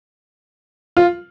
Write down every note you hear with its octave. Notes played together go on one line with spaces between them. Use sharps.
F4